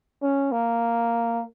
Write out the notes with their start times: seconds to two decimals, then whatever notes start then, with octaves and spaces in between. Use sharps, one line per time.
0.22 C#4
0.52 A#3